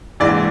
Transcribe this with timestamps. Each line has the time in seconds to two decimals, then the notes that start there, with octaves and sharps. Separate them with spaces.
0.20 A#1 G#2 E3 D5